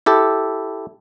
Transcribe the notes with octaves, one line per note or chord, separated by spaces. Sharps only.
E4 G4 A4